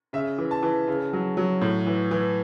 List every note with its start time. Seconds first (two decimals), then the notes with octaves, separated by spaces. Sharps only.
0.13 C#3 E5
0.38 E3
0.51 A5
0.63 E3
0.88 C#3
1.13 F#3
1.37 F#3
1.61 A2
1.87 E3
2.11 E3